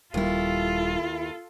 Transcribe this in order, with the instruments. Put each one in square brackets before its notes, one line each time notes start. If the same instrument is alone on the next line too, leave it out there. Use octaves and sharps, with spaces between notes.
[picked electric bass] D#1 G3 [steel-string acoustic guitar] D#2 E4 [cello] F4 A4